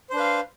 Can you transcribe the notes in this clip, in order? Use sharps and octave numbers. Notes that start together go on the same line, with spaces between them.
D4 B4 C5 F5